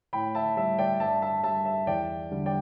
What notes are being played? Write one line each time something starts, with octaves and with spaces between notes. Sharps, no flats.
A2 G5 B5
E5 A5
G3 E5
D5 G5
G2 E5 A5
E5 A5
G3 E5 A5
E5
E2 D5 G5
D3 G3
D5 G5